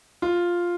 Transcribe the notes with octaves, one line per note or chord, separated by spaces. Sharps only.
F4